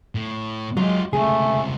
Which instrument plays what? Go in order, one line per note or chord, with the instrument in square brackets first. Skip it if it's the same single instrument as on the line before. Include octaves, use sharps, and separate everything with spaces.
[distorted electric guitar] A2
[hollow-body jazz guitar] F#3 [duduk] G#3 [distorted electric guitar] F4 G4
[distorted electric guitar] C#2 C3 [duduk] A3 [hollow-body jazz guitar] G#4